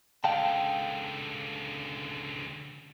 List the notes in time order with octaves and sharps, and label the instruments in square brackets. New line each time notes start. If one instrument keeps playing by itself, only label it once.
[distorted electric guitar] C#2 D3 [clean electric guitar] F5 G5 A5